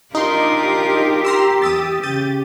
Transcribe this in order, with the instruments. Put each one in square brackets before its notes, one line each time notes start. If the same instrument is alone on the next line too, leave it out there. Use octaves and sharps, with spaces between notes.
[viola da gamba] D4 F4 A#4 [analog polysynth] D#4 C6 [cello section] G4
[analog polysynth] A#5 C6 E6
[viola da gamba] E2 [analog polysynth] D#6 E6 A6
[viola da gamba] C#3 [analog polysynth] G6 A6 D#7